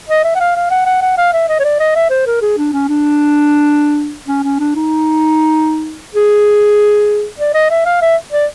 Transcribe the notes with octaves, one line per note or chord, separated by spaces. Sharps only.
D#5
E5
F#5
F5
F5
F#5
F#5
F#5
F5
E5
D#5
C#5
D5
D#5
E5
C5
A#4
G#4
D4
C#4
D4
C#4
C#4
D4
D#4
G#4
D5
D#5
E5
F5
E5
D5